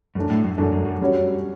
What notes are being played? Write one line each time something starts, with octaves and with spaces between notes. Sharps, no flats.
F#2 F#3 A3 D4
A2
F#2
F#2 F#3 A3 D4
F#2
F#2
G3 C#4 F#4 C#5